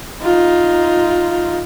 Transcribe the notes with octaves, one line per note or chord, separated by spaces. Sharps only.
D#4 F4